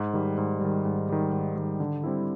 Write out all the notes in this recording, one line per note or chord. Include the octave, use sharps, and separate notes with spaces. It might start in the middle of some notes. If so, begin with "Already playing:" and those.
Already playing: G#2
D#3 G3
G#2
D#3 G3
G#2
D#3 G3
G#2
D#3 G3
D3
G3 C4 E4